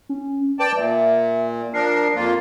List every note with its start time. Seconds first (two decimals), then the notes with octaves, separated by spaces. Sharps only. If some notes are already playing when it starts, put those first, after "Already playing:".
0.09 C#4
0.59 B4 D5 G5 A5
0.77 A#2 E5
1.74 F3 D4 A#4 C7
2.15 F2 A#3 F4